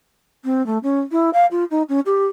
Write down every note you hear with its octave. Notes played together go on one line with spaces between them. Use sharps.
C4
A3
C#4
E4
F5
F4
D#4
C#4
G4